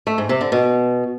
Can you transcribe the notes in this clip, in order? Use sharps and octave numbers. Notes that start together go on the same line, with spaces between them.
A3
G#2
C3
D3
B2